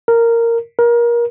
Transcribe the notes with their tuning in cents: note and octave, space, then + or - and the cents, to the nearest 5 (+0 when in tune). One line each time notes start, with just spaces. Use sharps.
A#4 -10
A#4 +25